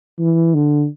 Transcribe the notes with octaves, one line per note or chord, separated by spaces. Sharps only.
E3
D3